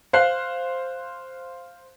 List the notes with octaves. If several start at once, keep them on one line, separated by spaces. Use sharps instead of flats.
C5 F5 F#6 C7